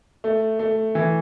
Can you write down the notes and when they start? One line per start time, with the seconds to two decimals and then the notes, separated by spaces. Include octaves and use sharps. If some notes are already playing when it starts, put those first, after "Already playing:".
0.24 A3
0.59 A3
0.95 E3